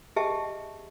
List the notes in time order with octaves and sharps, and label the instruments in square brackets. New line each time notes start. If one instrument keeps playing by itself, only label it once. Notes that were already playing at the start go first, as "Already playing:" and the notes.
[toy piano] G4 G#4 D#5 E5 G5 A5